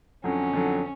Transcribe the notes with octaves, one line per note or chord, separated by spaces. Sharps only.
F2 D3 F#3 C#4
F2 D3 F#3